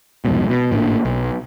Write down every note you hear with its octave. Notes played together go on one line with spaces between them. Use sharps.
C2 F2 G#2 B2
B2
G#1 A2 A#3 D4
B1